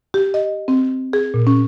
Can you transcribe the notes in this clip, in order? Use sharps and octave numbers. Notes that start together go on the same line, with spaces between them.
G4
D#5
C4
G#4
A#2
C#4